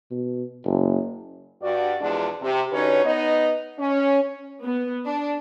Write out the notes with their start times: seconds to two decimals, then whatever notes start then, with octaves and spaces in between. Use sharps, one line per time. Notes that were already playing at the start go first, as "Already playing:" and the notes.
0.11 B2
0.65 F#1
1.61 G2 F#4 D5
2.01 E2 B2 F3 G#3 D4
2.41 C3
2.72 D3 C#4 D#4 F#4 B4 C#5
3.04 B3 D#4 B4 D#5
3.79 C#4
4.62 B3
5.05 D4